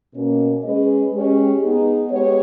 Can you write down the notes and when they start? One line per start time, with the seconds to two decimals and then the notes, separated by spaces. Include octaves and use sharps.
0.14 B2 A#3 C#4
0.63 G#3 C#4 G#4 B4 D#5
1.12 G#3 C#4 G4
1.61 B3 D#4 G#4
2.10 G#3 B3 G4 C#5